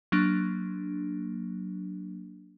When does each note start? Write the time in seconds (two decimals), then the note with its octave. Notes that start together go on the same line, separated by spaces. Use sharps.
0.12 F#3 A#3 D4